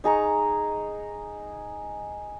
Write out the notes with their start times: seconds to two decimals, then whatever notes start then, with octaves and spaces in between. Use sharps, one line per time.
0.04 D#4 G#4 A#5 C#6